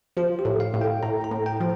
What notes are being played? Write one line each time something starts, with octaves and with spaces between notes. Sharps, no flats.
F3 F4
G4
A2
F5
A2
G5
A2 A#5
A#5
A2
G5
F3